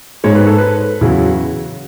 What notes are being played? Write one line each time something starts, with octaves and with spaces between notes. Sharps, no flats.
G#2 G#3 C#5
B4
A4
B4
E2 C#3 F#3 E4